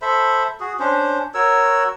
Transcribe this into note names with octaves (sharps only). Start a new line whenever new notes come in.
A4 C5 E5 B5
F#4 G#4
C#4 D4 C5
F#4 A#4 C#5 E6